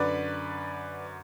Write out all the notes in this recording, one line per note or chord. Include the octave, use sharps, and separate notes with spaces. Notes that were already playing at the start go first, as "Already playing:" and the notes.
Already playing: F#2 D3 B4 D5